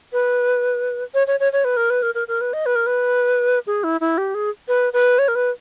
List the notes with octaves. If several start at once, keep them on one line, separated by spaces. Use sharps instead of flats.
B4
C#5
C#5
C#5
C#5
B4
A#4
B4
A#4
A#4
A#4
B4
D#5
B4
A#4
B4
G#4
E4
E4
G4
G#4
B4
B4
C#5
A#4
B4